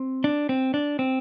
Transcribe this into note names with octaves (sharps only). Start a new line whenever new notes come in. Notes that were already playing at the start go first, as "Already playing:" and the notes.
Already playing: C4
D4
C4
D4
C4